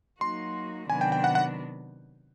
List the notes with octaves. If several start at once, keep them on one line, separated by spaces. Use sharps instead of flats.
F#3 A#3 D#4 F#4 C6
C3 D#3 F#3 B3 D4 G#5
G5
G5
F#5
F#5